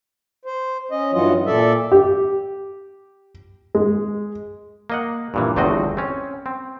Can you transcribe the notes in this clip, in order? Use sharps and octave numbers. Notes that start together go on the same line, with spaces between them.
C5
C#4 D#5
G2 E3 F#3 F4 D#5
A#2 A4 D5 E5
G4
G#3
A#3 D#5 F#5
G2 A#2 E3
G1 E2 A3 C4 F#4 D#5
C4 C#4
C4